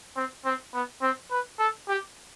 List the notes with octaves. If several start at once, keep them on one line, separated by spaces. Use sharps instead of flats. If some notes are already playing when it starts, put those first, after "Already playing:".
C4
C4
B3
C4
B4
A4
G4